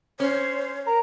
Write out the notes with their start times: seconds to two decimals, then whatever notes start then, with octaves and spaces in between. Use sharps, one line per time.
0.20 C#4 C5 C#5
0.87 A#4 A#5